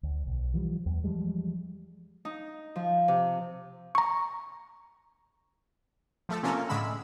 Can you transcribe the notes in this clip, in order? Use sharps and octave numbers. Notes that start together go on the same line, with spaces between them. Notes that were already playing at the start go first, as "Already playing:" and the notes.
D2
B1
E3 F3 G3
E2
E3 F3 G3 G#3
D#4
F3
C3
A#5 C#6
F3 A3 A4
C3 A#3 C#4 F4 A4 A#4
A2 D3 G#3 B5 E6